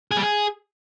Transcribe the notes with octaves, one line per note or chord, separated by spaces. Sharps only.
G#4
G3
G#4